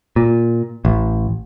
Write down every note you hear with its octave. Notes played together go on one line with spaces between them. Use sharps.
A#2
A1